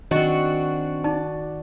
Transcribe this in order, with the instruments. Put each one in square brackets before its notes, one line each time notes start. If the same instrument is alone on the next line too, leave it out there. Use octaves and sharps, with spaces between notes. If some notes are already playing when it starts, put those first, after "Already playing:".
[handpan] D#3 [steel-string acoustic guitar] C4 D4 [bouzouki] F#4 [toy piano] D#5
[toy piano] D#4 A5 [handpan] D5